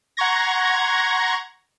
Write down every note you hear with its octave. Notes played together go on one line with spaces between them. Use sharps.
F#5 A#5 C6 C#6 G#6 A#6